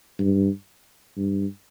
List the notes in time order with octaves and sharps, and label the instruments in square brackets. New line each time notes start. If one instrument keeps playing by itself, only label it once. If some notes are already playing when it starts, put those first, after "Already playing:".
[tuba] G2
G2